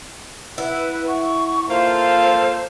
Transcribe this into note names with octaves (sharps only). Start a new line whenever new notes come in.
E4 B4 F#5
F#5 C#6
A#3 F4 A4 C5 F5